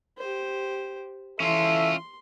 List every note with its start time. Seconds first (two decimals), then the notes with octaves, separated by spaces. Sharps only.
0.18 G4 C5
1.40 E3 C#4 F4 A4 E5 C6